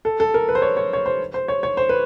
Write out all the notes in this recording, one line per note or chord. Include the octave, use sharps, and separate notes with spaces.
A4
A4
A#4
B4
C5
C#5
C#5
C#5
C5
C5
C#5
C#5
C5
B4